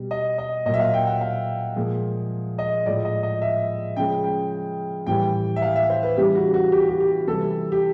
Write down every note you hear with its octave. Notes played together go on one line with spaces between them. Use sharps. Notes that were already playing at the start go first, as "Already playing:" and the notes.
Already playing: B2 G3
D#5
D#5
A#2 F#3 D#5 E5
F5
G5
F#5
F5
A#2 F3 G#3
D#5
A2 F3 G#3 D5
D#5
D#5
E5
C#3 F3 G#3 G5
G5
A2 E3 G3 G5
E5
F5
E5
C5
B4
C#3 E3 G3 G4
F#4
F#4
G4
F#4
G4
G4
C3 E3 G3 A4
G4